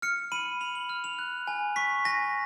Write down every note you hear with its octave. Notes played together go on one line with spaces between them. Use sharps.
F6 C#7
B5 D#7
B5 F7
F#7
F6 F7
F7
F#6
G#5
C#6 B6
G#5 A#6